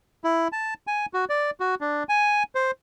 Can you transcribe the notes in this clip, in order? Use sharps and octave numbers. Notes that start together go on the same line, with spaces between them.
E4
A5
G#5
F#4
D5
F#4
D4
G#5
C5